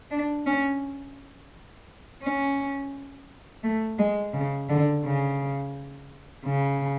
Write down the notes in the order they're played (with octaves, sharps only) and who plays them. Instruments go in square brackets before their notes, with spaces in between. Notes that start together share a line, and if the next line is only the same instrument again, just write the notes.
[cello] D4
C#4
C#4
A3
G#3
C#3
D3
C#3
C#3